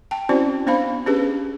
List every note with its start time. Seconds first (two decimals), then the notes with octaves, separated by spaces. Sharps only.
0.11 G5 A5
0.29 C4 C#4 E4 F#4 C5 D5
0.67 B3 D4 C5 F5 B5
1.06 C#4 D4 G4 G#4 B4